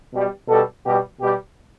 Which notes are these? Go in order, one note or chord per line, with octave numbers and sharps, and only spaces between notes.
B2 G3
B2 G3 A4
B2 G3 G4
B2 G3 G4